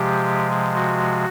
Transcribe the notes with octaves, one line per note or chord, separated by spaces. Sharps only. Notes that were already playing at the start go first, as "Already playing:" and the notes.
Already playing: C3 F3 G#3 G4
F#4